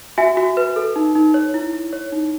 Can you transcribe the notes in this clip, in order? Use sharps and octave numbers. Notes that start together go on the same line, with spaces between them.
F#4 E5 G#5
F#4
B4
A4
D#4
D#4
C#5
E4
E4
C#5
D#4